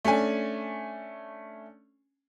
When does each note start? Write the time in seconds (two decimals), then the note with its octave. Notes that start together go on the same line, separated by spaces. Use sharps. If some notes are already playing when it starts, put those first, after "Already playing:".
0.05 A3 C#4 D4 G#5